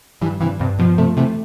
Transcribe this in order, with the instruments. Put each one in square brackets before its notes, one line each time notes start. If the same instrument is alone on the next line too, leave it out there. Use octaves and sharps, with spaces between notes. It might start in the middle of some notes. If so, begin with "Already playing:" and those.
[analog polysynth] G2 [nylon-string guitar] E3 G3
[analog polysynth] G2 [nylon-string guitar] C3 E3
[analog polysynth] G2 [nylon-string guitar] C3
[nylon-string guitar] B2 [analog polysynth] F3
[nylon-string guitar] C3 [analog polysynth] A3
[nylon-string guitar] C3 E3 [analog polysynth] A3